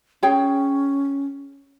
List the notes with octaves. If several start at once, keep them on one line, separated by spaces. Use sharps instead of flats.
C#4 G#4 C#5 G5